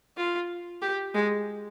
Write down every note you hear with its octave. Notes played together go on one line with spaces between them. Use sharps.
F4
G4
G#3